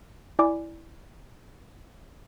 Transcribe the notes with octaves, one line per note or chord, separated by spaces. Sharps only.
E4 D5 G#5 D6